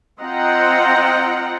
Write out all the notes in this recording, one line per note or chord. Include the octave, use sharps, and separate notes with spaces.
C4 F4 D#5 F#5 G5 A#5